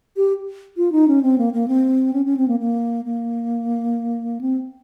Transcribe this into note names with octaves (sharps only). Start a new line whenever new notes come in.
G4
F4
D#4
C#4
C4
A#3
A#3
C4
C#4
C#4
C4
A#3
A#3
A#3
C4